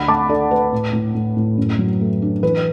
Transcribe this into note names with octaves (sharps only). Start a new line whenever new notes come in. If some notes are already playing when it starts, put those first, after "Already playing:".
Already playing: D2 F#5 B5
A3 A5 D6
D4 A4 D5
A3 B4
A2
A2
A2
A2
F#2
F#3
A3
D4
E3 B4